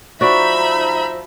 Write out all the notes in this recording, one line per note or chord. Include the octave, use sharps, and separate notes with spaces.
F3 D#4 F#4 D5 E5 B5